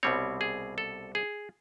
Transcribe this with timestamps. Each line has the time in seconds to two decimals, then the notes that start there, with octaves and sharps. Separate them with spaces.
0.03 C2 B2 G3 C4 C#5
0.41 G#4
0.78 A4
1.15 G#4